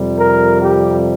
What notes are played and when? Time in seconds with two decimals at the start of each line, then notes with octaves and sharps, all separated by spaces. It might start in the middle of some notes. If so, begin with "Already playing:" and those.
Already playing: F2 C3 G3
0.19 A#4
0.60 G4